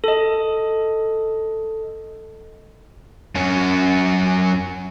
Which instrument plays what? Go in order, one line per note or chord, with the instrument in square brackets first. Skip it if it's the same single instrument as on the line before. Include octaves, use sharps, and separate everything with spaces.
[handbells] A4 D#5
[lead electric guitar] F#2 C#4